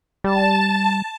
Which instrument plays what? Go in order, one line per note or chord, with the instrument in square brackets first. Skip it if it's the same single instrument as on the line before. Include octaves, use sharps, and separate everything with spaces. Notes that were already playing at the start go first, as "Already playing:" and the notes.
[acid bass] G3 [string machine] A5